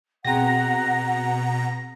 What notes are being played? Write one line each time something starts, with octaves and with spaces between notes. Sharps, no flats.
B2 C4 G#4 F#5 G5 A#5 A#6